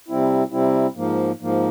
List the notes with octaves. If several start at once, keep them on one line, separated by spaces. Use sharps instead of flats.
C3 G3 C4 E4
C3 G3 C4 E4
G#2 F3 A#3
G#2 F3 A#3